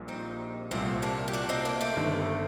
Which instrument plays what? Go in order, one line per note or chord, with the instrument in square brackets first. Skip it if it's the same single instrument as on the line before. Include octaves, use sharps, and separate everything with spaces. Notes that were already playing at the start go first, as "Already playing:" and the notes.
Already playing: [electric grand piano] A#1 A#2 G3
[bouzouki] C4 D#4
[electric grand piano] C2 A#2 G3 [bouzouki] A3 C4
[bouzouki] A#3 D4
G4
D4 F#4
C4 D#4
A#3 D4
A3 C4
[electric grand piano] G1 G2 D#3